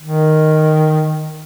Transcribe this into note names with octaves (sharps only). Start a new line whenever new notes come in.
D#3